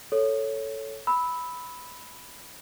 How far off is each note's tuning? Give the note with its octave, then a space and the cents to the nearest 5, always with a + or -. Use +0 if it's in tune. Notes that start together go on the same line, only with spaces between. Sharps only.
A4 +0 C#5 +0
B5 +0 E6 -20